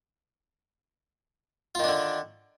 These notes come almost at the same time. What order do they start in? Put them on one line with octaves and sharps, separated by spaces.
F4 D#3 D4 D3